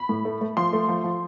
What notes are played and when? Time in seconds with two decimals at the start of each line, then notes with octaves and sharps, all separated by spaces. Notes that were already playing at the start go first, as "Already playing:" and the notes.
Already playing: B5
0.09 A2
0.25 A3
0.41 A3
0.57 F3 C6
0.73 A3
0.89 F3
1.04 F3